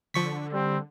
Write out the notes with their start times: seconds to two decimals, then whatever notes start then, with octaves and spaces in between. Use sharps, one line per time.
0.14 D3 F3 C#6 B6
0.53 G3 C4